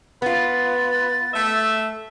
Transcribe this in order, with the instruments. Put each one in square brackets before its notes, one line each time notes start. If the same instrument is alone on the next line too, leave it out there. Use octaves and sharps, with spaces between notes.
[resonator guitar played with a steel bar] B3 F4 [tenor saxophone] B4 [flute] A6
[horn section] A3 E5